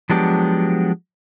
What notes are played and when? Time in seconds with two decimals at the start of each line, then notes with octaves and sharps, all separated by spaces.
0.10 F3 F#3 G#3 B3 D4 G4